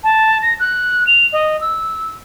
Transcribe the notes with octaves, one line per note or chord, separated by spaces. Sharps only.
A5
A#6
F#6
F7
D#5
E6